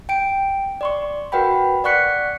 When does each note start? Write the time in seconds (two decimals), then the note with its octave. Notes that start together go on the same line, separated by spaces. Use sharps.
0.09 G5 D7
0.81 D5 C6 C#6
1.32 F#4 A#4 B4 F#5 G5 B5
1.84 D5 F#5 C#6 F#6 B6 C#7